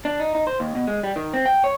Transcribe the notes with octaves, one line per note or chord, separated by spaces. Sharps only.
D4
D#4
D#4
C5
D#2
B2
G#3
G3
D#3
C4
G5
C#5